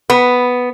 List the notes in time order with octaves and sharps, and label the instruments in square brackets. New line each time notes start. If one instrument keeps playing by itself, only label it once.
[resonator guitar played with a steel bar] B3